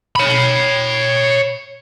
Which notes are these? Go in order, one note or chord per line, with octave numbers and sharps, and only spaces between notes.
C#5 B5